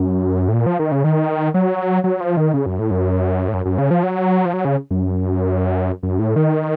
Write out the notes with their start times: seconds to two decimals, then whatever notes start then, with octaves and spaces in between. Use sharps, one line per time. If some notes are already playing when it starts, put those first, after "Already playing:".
Already playing: F#2
0.48 A2
0.54 A#2
0.66 F3
0.79 D#3
0.92 C#3
1.04 D#3
1.54 F#3
2.04 F#3
2.21 F3
2.37 D#3
2.54 C#3
2.66 F#2
2.79 A2
2.91 F#2
3.48 A2
3.54 F#2
3.65 F#2
3.78 C#3
3.91 F3
4.03 F#3
4.45 F3
4.53 F#3
4.65 C#3
4.91 F#2
6.03 F#2
6.19 A2
6.36 D#3